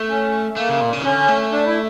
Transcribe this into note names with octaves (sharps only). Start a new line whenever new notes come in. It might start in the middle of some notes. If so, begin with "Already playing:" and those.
Already playing: A3
C#4
A3 A#3
C#3
A#2
C#3
E3
D3 C#4
A3
D4
E4